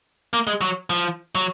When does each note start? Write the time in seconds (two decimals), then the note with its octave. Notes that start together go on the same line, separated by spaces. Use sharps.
0.33 A#3
0.47 G#3
0.61 F#3
0.90 F3
1.35 F#3